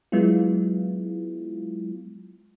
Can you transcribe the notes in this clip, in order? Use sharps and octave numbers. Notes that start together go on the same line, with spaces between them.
F#3 G#3 B3 E4 F4